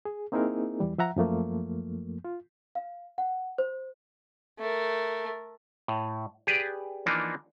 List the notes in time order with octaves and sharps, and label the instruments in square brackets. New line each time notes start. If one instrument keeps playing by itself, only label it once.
[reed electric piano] G#4
A#3 C4 D#4 E4 G#4 A#4
E2 E3 G3
F3 E5 F#5 A#5
F#2 F3 A3 A#3
F4
[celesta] F5
F#5
C5
[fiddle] A3 A#4
[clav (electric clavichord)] A2
G4 G#4 B4 D5
E3 F3 A#3 D4 D#4